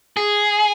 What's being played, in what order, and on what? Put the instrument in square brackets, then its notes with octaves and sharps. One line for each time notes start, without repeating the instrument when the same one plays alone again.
[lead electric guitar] G#4